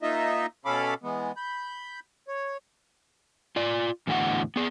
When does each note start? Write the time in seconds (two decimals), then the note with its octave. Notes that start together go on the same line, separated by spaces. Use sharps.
0.02 A#3 D#4 F4 D#5 E5
0.65 B2 C#4 A4 F5 B5 D6
1.03 E3 G#3 B3
1.37 B5 G6
2.28 C#5
3.56 F4 D5
4.07 E2 A2 D3 F#4 F#5
4.56 B3 G#4